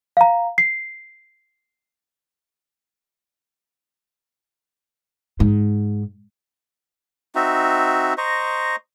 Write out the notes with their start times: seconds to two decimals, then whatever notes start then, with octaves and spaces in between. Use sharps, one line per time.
0.17 F5 A#5
0.58 C7
5.40 G#2
7.35 C4 D#4 F#4 E5
8.18 C5 D#5 A#5 C#6